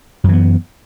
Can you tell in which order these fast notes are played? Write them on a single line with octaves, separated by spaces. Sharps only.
F#2 E3 B3